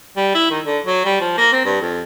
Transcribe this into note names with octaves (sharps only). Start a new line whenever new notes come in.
G3
E4
D#3
D3
F#3
G3
F3
A#3
C4
G2
F2